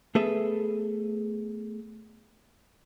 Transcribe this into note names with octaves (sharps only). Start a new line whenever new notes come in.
A3 B3 G#4 A4 B4 E5